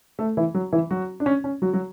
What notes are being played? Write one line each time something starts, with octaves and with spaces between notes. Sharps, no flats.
A3 A4
E3 E4
F#3 F#4
E3 E4
F#3 F#4
D4
C#4
C#4
F#3 F#4
F#3 F#4